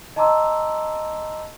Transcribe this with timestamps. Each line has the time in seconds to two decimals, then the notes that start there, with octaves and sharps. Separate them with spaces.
0.16 D#5 A5 A#5 C6 D6 E6